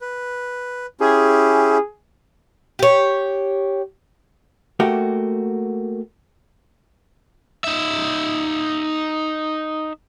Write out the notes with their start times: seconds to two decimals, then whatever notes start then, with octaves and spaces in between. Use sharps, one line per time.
0.01 B4
1.00 C#4 E4 G4 G#4
2.79 G4 C#5
4.80 A3 A#3 F#4 G4
7.64 D#4 E5